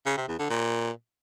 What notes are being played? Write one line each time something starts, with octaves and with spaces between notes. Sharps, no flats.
C#3
C3
E2
D3
A#2